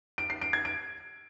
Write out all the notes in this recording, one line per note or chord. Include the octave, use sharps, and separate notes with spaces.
D7
C7
D7
G#6
D7